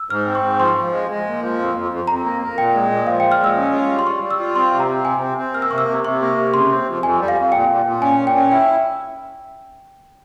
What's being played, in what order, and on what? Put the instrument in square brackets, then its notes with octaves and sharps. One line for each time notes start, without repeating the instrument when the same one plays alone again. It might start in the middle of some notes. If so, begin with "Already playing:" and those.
Already playing: [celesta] E6
[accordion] G#2 [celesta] F6
[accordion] C4
[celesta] C#6
[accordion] G#2
[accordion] F3 [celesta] C6
[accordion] F3
G#3
G#3
A#2
F3
F2
F2
F2
[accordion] F2 [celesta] A#5
[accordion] A#3
A#3
[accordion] A#2 [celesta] G5
[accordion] G#3
A#2
[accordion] F3 [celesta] F5
[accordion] A#2 [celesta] G5
[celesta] F6
[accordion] G#3 [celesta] E6
[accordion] C#4
F4
G3
[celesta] C6
[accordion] G3 [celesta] C#6
[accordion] G3
[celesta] E6
[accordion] F4
[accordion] C4 [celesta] C6
[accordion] C3
[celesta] A#5
[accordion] C4
[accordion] C3 [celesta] G#5
[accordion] C4
C4
[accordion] A#3 [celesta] F6
[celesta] E6
[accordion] C3 [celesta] C#6
[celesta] E6
[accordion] C3
[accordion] C3 [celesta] C#6
[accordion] A#3
C3
[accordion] C#3 [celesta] C6
[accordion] C4
F2
[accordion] F2 [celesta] G#5
[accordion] G3
[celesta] F5
[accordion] F2
[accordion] A#2 [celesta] G5
[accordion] A#2
A#2
[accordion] C#4 [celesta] G#5
[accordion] A#2
[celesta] G5
[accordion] C#4
[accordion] E4 [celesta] G5